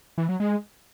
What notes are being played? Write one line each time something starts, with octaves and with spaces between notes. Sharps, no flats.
E3
F#3
G#3